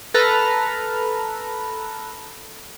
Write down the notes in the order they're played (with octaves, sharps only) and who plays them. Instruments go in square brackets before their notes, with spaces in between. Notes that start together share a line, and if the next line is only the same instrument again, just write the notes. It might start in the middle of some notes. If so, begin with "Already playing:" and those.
[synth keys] A4 B4 A#5 F6